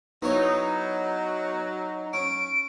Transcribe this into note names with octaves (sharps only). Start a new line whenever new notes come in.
F#3 B3 D#4 E4 C#5
C#4 D7